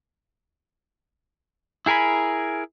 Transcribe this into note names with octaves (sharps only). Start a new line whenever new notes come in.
E4 G#4 A#4 G#5 B5